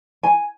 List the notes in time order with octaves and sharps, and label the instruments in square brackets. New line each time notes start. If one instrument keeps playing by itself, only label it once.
[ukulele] G#5